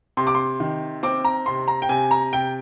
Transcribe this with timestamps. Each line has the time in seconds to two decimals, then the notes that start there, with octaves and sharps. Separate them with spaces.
0.17 C3 C6
0.27 D6
0.35 C6
0.60 D#3
1.03 C4 D6
1.25 A#5
1.46 C3 C6
1.68 A#5
1.82 G5
1.89 C3 G#5
2.11 A#5
2.33 C3 G5